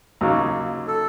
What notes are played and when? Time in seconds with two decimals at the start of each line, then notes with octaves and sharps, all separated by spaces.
0.21 D#2 C#3 F#3
0.88 A4